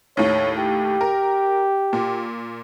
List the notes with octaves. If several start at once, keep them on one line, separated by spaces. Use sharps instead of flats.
D#2 A2 C#5
G4
A#4
A#2